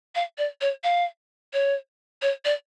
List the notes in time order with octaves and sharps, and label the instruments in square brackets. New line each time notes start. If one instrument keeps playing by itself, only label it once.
[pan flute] F5
D5
C#5
F5
C#5
C#5
D5